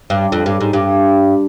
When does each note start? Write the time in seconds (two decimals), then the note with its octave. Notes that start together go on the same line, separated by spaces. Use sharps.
0.10 G2
0.32 F2
0.46 G2
0.60 G#2
0.73 G2